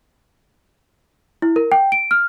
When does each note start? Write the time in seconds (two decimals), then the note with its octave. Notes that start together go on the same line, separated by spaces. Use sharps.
1.42 E4
1.56 A#4
1.72 G5
1.92 D7
2.11 F6